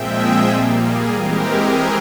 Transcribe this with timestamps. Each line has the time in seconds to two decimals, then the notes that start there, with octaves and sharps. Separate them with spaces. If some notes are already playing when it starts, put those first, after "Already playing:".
Already playing: A#2 F3 G#3 C4 E5 G5
0.15 G#4
0.48 A#2 G3 A#3
0.81 G#4
1.12 E3 G#3 C4 G4 A#4
1.46 G#4